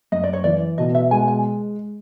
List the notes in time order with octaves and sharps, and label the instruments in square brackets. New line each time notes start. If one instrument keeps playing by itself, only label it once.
[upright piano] F#2 [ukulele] D#5
[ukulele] D5
C#5
[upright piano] E3 [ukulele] D5
[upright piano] B2 [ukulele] D#5
[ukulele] E5
[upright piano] G#3 [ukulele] G#5
[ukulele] G#5